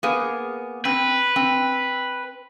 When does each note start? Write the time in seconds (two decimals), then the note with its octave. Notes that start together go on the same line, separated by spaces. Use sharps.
0.03 A#3 B3 G#4
0.85 C4 B4
1.36 C4